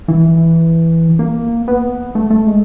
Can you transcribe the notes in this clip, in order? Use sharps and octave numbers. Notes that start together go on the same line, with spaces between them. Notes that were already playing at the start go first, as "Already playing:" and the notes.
E3
A#3
B3
A3
A3
G#3